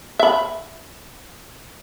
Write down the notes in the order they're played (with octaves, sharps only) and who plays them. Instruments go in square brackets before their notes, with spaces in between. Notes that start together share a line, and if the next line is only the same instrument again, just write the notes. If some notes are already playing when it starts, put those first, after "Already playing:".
[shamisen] E5 B5